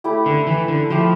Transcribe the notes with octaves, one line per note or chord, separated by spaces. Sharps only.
A3 E4 G4
D3
E3
D3
F3 A3 E4 G4